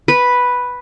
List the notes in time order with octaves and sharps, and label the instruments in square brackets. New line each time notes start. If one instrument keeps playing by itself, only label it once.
[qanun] B4